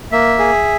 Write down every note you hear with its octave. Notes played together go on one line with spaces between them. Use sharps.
A#3 E5
G#4